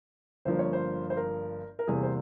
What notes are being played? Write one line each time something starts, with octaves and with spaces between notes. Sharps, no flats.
G1 G2 F3 A#3 C5
C#5
C5
C5
A#4
A#4
E2 C3 G3 A#3 G#4
C5